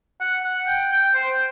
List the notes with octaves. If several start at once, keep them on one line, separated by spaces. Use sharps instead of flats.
F#5
F#5
G5
G5
C5